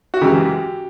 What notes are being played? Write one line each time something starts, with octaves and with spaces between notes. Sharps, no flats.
F#4
F#2 C#3 E3 G#3 G4